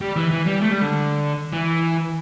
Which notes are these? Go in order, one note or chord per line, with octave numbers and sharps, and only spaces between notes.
G3
E3
E3
G3
A3
G3
D3
E3